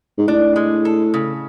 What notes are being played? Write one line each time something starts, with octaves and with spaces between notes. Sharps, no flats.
G#2
A2 D4
G#3
A4
C#3